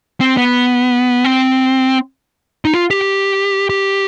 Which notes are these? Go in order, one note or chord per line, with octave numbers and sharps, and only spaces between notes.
C4
B3
C4
D#4
F4
G4
G4